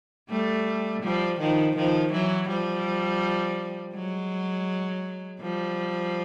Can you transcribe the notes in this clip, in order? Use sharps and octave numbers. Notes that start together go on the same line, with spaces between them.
G3 A3
F3 G3
D#3 F3
D#3 F3
E3 F#3
F3 G3
F#3 G#3
F3 G3